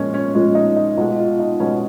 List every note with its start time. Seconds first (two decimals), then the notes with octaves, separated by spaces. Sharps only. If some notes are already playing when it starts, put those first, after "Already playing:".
Already playing: A#2 F3 G#3 C#4
0.14 C#4
0.34 A#2 F3 G#3 C#4
0.55 D#4
0.76 D#4
0.97 B2 G#3 F4
1.19 F4
1.39 D#4
1.60 B2 G#3 C#4